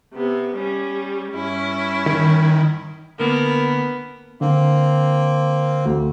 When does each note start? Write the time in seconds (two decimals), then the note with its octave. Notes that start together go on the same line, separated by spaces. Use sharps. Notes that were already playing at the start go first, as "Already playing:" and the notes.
0.13 C3 B3
0.55 G3 C#4
1.31 G2 C#4 E4
2.06 D#3
3.20 D3 A#3 B3 A#4
4.41 D3 A#3 C4
5.85 D2 F#4